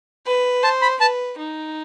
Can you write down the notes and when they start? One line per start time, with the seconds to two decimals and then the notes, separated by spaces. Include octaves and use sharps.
0.26 B4
0.63 C5 A5
0.82 B5
1.00 B4 A5
1.38 D#4